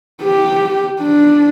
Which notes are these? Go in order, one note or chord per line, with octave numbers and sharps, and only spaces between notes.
G4
D4